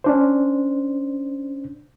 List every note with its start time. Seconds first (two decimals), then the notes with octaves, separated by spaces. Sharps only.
0.04 C#4 D4 C5